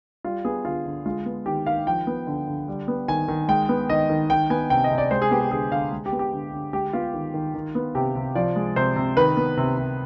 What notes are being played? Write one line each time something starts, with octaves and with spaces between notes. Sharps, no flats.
G3 F4
B3 G#4
D3 F4
D3
G#3 F4
B3
D#3 G4
D#3 F5
F3 G5
B3
D3
D3
G3
B3
D#3 G#5
D#3
G#3 G5
B3
D#3 D#5
D#3
D#3 G5
B3 G#5
C3 G5
D#5
C3
D5
G#3 C5
G#4
B3 G4
G4
D3 G#4
D3 F5
G#3
G4
B3
G4
D3
D3
G#3 G4
B3 F4
D#3
D#3
D#3
B3
C3 G4
C3
F3 D5
G#3
C3 C5
C3
D#3 B4
B3
C3
C3